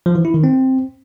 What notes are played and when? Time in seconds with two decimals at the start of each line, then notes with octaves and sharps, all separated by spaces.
0.06 F3
0.15 E3
0.25 E4
0.34 D#3
0.44 C4